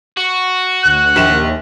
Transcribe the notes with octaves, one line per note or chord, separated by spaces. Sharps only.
F#4
D2 F#6
A#1 D#2 E7